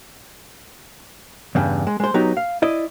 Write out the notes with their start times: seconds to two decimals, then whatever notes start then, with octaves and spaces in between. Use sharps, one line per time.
1.55 E2 G2 C#3
1.87 G#3
2.00 G#3 C5
2.14 F#3 B3 D#4 G4
2.37 F5
2.62 E4 D5 D#5